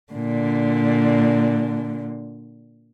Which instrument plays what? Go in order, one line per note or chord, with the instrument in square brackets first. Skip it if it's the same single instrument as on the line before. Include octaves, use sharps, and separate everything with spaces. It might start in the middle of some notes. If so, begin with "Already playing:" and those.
[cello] A#2 D3